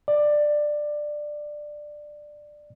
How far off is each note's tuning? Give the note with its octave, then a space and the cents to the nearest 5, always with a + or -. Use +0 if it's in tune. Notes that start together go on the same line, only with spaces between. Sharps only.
D5 +15